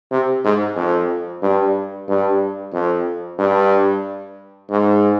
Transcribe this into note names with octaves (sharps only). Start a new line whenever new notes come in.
C3
G#2
F2
G2
G2
F2
G2
G#2